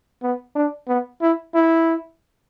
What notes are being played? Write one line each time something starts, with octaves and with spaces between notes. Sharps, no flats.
B3
D4
B3
E4
E4